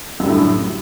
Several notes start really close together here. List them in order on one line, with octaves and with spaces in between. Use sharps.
F#2 G3 D3 A2